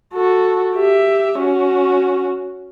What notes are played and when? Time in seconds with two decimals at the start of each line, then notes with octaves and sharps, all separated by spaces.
0.13 F#4 A4
0.75 G4 E5
1.38 C#4 F#4